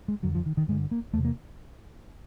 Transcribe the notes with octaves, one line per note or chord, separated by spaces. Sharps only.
G#3
F2 D3 F#3
F3
D#3
D#3
G2 D3 G#3
A#3
E2 A3
C3
A#3